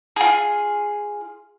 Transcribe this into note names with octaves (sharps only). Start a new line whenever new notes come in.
F4 G#4